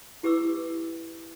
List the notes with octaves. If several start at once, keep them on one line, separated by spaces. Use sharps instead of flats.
E4 G4 B4 D6 E6